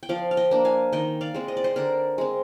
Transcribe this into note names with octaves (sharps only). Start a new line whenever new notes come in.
G5
F3 D5 F5
F5
D#5 G5
A#3 D4
F5 G#5
D#3 D#5 G5
D5 F5
G#3 C4
D#5
D5
C5 D#5
D3 A#4 D5
G#3 C4